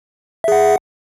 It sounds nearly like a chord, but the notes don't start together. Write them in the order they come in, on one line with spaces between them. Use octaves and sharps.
E5 G#4 F#5